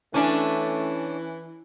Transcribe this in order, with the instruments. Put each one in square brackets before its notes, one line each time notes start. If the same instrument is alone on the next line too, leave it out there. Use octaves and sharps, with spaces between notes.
[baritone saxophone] E3 [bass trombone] A3 [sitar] C#4 D4 [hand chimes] G#5